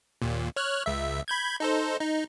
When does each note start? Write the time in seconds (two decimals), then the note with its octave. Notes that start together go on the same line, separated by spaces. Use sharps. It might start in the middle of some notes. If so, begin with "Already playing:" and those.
0.22 D#2 A#2
0.56 C#5 F6 F#6
0.86 C#2 E5
1.28 B5 G6 G#6
1.60 D#4 A4 C5
2.00 D#4